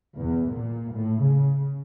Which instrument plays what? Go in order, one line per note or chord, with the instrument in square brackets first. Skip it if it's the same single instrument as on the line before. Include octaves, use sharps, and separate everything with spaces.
[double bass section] E2
A#2
A2
C#3